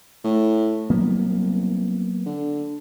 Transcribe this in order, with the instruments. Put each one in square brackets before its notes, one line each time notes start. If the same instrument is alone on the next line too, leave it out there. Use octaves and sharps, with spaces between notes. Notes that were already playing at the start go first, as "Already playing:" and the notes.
[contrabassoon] A2
[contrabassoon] C2 [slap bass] F#3 A#3 B3
[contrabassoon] D3